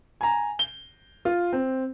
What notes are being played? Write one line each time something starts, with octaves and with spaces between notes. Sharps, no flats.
G#5 A#5
G7
F4
C4